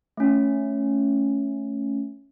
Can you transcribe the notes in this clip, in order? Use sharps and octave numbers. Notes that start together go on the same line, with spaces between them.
A3 C#4